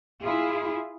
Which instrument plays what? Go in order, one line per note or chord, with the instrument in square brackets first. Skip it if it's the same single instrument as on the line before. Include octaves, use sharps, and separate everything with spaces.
[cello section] E4 F4 G#4